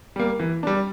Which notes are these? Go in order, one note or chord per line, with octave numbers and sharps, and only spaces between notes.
G3 A#3
E3
G3 D4